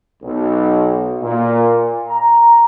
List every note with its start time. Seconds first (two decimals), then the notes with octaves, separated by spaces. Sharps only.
0.23 B1
1.23 A#2
2.08 A#5